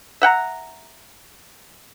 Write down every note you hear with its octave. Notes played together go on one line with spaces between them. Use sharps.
E5 F#5 G5 A#5